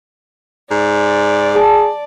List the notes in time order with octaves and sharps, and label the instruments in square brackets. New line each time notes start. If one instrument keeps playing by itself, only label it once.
[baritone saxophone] G#2 [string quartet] D5
[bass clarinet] G#4 [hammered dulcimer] A5